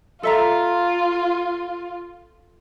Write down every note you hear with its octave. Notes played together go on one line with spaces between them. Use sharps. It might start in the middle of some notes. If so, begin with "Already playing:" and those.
F4 A4 E5 A#5